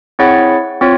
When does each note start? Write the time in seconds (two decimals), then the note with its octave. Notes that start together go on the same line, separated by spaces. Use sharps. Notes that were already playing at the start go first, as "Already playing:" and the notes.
0.19 C4 E4 G#4 C#5 F#5
0.81 C4 F4 C#5